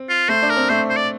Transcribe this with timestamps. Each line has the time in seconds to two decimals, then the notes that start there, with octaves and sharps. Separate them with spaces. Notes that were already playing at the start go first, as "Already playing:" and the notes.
Already playing: C4
0.09 F4
0.29 A3 C5
0.42 D4
0.50 A#4
0.57 C4
0.69 A3 C5
0.90 C5
0.96 D5